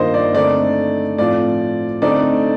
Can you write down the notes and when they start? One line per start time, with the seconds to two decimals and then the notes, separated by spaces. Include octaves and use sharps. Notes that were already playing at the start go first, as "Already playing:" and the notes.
Already playing: G2 D#3 A#3 F4 C5 D#5
0.14 D5
0.34 D3 A3 C4 D#4 D5
1.18 A2 F3 C4 F4 D5
2.02 D3 A3 C4 D#4 D5